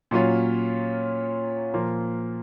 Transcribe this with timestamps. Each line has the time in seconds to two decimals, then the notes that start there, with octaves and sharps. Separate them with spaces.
0.11 A#2 F#3 C#4 F4
1.73 A#2 F3 A#3